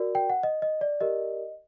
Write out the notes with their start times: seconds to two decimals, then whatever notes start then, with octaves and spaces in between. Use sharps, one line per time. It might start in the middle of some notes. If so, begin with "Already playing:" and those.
Already playing: F#4 A#4 D5
0.15 G5
0.30 F#5
0.43 D#5
0.62 D#5
0.81 D5
1.01 G4 A#4 D5 D#5